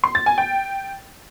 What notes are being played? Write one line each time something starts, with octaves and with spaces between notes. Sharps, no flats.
C6
A6
G#5
G5